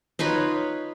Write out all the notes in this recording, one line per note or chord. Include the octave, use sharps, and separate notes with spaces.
D#4 F4 B4 C#5